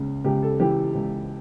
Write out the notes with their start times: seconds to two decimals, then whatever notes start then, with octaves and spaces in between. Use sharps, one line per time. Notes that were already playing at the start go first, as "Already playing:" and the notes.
Already playing: C#2 C#3
0.24 C#2 G4
0.43 A4
0.60 E3 G4
0.95 C#2